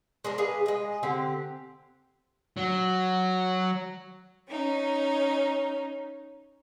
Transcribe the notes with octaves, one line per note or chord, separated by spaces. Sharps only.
G#3 D4 A#4
G#4 B4 F5
G#3 D#5
D3 C4 G4
F#3
C#4 D#4